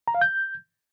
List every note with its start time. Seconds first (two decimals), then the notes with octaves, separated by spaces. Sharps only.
0.08 A#5
0.14 F5
0.21 G6